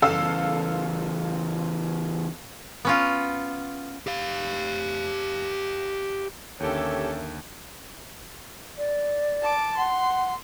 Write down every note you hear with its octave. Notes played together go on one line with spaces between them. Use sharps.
E2 C#3 A4 F5 E6
B3 C#4 F4
G4 F5
D#2 D3 C#4 G4 A4 A#4 C#5 E5
D5
A5 D6
F#5 C6